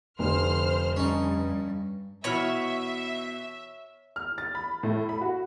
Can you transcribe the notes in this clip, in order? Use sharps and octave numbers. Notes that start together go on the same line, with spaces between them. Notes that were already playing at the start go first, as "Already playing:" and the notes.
F1 D3 C5 F6
G2 C#4 D#4
B2 E3 C#5 E5 B5 F6
F6
A6
B5
A2
B5
F#4